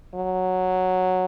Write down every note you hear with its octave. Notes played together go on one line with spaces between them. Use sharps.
F#3